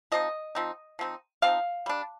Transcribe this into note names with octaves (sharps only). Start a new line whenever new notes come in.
F3 C4 D#4 D#5
F3 C4 D#4
F3 C4 D#4
F3 C4 D#4 F5
G3 D4